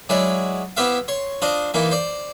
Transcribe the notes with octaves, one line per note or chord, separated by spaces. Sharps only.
F#3 G#3 E4 C#5 D5
B3 E4 G4 C5 E5 F5
C#5 C6
D4 F4 C5 D#5
E3 A#3 D#4 E4
C5 D5